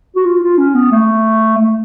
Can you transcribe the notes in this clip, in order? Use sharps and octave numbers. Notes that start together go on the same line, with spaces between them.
F#4
F4
F4
C#4
B3
A3
A3